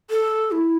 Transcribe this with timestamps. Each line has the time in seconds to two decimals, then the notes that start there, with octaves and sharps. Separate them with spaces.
0.11 A4
0.52 E4